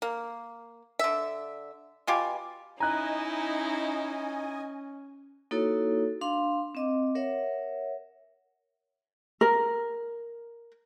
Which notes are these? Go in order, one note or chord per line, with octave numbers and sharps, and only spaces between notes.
A#3
D3 E5
B2 F4 G4 G#5
C#4 D#4 E4 D#5 G#5 A#5 F#6
A#3 D#4 E4 F#4 A4 C#5
D4 F5 C6
C4 D#5 D6
A#4 C#5 E5 F#5
A#4